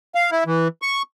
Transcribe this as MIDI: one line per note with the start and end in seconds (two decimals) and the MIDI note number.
0.15 0.30 77
0.31 0.44 64
0.46 0.68 52
0.82 1.02 85